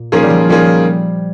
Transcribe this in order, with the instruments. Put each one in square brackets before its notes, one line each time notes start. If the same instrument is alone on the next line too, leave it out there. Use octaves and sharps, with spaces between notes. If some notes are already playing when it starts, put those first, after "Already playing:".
Already playing: [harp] A#2
[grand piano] D#3 A#3 C#4 F4 G#4 [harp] F3
[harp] G3
F3
[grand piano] D#3 A#3 C#4 F4 G#4 [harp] G3